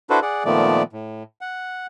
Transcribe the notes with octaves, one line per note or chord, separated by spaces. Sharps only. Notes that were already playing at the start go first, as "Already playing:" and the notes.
D4 E4 F#4 A4 B4 C5
G#4 D5 F#5
A#2 D#3 F3 A3 B3 D5
A2
F#5